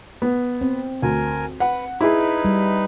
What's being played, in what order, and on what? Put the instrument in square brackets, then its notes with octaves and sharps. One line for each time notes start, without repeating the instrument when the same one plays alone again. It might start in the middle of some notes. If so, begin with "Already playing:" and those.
[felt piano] B3
[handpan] C4
[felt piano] D2 [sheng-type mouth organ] A#4 G#5
[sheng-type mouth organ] B4 [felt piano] F#5
[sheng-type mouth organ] D#4 B4 [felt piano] E4 G#4
[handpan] G3